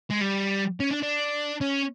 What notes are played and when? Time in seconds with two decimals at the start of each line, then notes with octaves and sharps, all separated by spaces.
0.11 G#3
0.21 G3
0.80 C#4
0.91 D4
1.03 D4
1.61 C#4